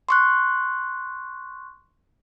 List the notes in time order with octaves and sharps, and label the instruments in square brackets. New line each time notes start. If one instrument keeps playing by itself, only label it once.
[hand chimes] C6 C#6 F#6